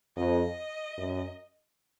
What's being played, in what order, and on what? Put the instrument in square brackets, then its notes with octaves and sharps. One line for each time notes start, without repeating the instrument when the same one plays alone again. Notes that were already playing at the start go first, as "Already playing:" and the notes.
[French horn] F2 [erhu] D#5
[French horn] F#2